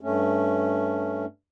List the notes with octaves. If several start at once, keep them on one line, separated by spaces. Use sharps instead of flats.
G2 A3 C#4